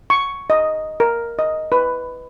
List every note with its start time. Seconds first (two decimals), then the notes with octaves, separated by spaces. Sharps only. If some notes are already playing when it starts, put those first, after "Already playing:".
0.10 C#6
0.50 D#5
1.00 A#4
1.39 D#5
1.72 B4